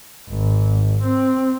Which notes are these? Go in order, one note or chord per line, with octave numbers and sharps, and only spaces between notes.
G#1
C4